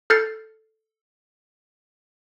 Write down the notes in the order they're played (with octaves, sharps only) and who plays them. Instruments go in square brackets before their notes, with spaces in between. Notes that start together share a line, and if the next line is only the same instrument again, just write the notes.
[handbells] A4 F6 G6 A6 C7 C#7